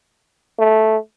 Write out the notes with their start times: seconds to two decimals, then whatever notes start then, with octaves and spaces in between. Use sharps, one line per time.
0.59 A3